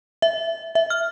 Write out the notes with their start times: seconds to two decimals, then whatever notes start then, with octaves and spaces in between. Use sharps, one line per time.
0.22 E5
0.75 E5
0.90 F6